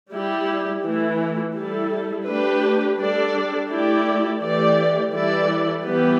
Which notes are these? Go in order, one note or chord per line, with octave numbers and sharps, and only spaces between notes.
G3 E4 G4
E3 A3 E4
G3 E4 A4
A3 D4 G4 B4
G3 D4 A4 D5
A3 E4 G4 D5
E3 A3 G4 D5
E3 G3 E4 A4 D5
E3 G3 B3 G4 B4